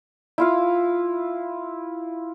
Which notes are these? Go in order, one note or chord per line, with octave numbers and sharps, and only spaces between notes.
E4 F4 F5